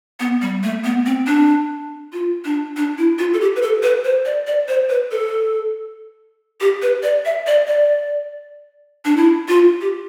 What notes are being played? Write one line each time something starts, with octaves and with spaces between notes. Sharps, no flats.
B3
G3
A3
B3
C4
D4
F4
D4
D4
E4
F4
A4
G4
B4
A4
B4
C5
D5
D5
C5
B4
A4
G4
B4
D5
E5
D5
D5
D4
E4
F4
G4